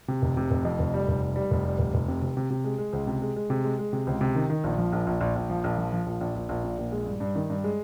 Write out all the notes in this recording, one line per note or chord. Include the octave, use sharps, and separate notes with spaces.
C3
F1
C3
F1
F2
F1
G3
F1
G3
G3
F1
G3
F1
F1
C3
C3
C3
C3
G#3
G#3
C#2
C3
G#3
G#3
C3
G#3
G#3
C3
C#2
C3
D#3
D#3
A#1
F3
A#1
A#1
A#1
A#1
F3
A#1
F3
F3
A#1
A#1
A#1
A#1
A#2
A#1
G#3
G2
G2
D#3
G2
G#3